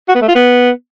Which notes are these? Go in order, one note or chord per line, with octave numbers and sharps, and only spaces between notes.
F#4
B3
A3
F4
B3